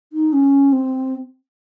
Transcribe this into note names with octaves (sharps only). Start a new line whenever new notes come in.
D#4
C#4
C4